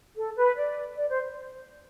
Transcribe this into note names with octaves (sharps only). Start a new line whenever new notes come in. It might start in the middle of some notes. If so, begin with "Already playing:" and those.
A4
B4
D5
D5
C5